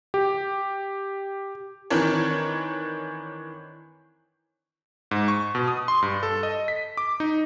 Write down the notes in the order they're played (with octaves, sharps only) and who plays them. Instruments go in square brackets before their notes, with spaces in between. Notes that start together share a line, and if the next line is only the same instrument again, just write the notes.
[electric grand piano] G4
[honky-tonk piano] D#3 E3 C4 D4 A#4 C#5
[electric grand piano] G#2
C#6
B2
D#6
C6
G2
A4
D#5
B6
D6
D#4